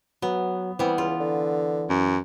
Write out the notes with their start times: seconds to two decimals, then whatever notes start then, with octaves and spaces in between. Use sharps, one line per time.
0.22 F#3 B3
0.79 E3 G3 B3 C4
0.98 C#2 F4
1.20 D3
1.89 F#2